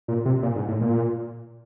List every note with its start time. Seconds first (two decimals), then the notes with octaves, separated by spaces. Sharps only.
0.08 A#2
0.25 C3
0.43 A#2
0.56 G#2
0.68 A2
0.81 A#2